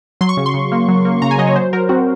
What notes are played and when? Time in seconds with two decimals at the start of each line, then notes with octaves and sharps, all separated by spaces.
0.21 F#3 C6
0.29 C#6
0.37 C#3
0.46 C6
0.54 C#3
0.72 A#3
0.88 F#3
1.05 A#3
1.22 C#3 A#5
1.31 G#5
1.38 F#3 D#5
1.47 C#5
1.56 F#3 C5
1.73 F#3 A#4
1.89 C4 F#4